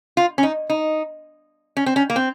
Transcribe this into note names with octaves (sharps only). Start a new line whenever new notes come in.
F4
C#4
D#4
D#4
C#4
C4
C#4
A#3
C4